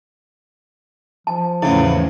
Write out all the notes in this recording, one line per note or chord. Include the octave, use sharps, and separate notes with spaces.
F3 A5
E2 A2 C#3 A3 B3 E4